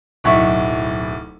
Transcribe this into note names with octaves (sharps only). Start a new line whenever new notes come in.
D1 B1 E4 C#6